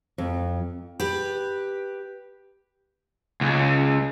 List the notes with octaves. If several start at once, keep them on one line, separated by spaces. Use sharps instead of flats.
F2
G4 B4
C#2